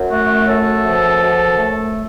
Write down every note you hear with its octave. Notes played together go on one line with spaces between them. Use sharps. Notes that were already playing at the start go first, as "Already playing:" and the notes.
Already playing: F#2
A3 F#4
F#2 A4
F3
F#2
A3